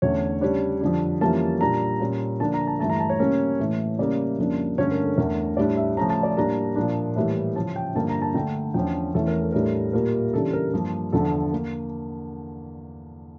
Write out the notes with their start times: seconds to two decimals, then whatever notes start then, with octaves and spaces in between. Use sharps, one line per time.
0.02 E2 D3 A3 C#4 C#5
0.41 C#3 G3 D4 C#5
0.81 F2 D3 G3 D4
1.21 F2 E3 G3 A#3 C#4 A5
1.61 A#2 G3 D4 A#5
2.00 A#2 G3 C#4
2.40 D3 F3 A#3 D4 A5
2.54 A#5
2.67 A5
2.79 G2 E3 A3 A5
2.90 A#5
3.00 A5
3.09 C#5
3.20 C#3 G3 A#3 C#4
3.60 A2 E3 A3
3.99 C#3 G3 A#3 D5
4.38 F2 C#3 G3 A#3 D4
4.78 G2 D3 A3 C#4 C#5
4.91 A#4
5.04 A4
5.17 E2 D3 A3 A#4
5.57 A2 G3 D4 D5
5.77 E5
5.97 C#3 F3 A3 C#4 A#5
6.10 A5
6.23 D5
6.37 A2 G3 A#3 D4 A#5
6.76 A#2 F3 A#3 D4
7.16 A2 E3 G3 A#3
7.56 C#3 F3 C#4 A5
7.76 G5
7.95 G2 D3 F3 A#3 A5
8.09 A#5
8.22 A5
8.34 D3 A3 D4 G5
8.74 E2 D3 F3 C#4 G5
9.14 E2 E3 A3 C#4 A4
9.28 A#4
9.41 A4
9.52 A2 G3 D4 A#4
9.63 A4
9.93 A#2 G3 A#3 A#4
10.33 C#3 E3 G3 D4 A4
10.53 A#4
10.74 G2 F3 A#3
11.13 E2 D3 F3 A4
11.53 A#3